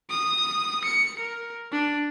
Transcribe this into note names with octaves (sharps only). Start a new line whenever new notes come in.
D#6
C#7
A#4
D4